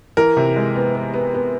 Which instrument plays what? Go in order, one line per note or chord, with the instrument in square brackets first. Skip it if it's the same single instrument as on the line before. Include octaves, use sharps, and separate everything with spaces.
[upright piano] E3 A#4
C3
G#3
B3
B3
B3
B3